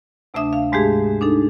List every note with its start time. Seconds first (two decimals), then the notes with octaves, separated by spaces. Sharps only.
0.34 D2 C3 A3 D4 E5 D#6
0.53 F5
0.72 G#2 G#3 A3 G4 G#4
1.21 D4 D#4 A4